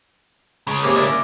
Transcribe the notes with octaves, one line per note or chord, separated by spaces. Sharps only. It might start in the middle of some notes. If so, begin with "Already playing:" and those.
C#3 G#3
D#2 C3 A#3
D4 E4 A#4